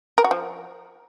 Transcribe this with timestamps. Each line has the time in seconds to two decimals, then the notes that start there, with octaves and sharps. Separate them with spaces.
0.18 A#4
0.24 F#4
0.31 F3